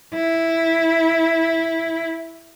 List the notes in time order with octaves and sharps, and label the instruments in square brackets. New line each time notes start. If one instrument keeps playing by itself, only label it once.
[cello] E4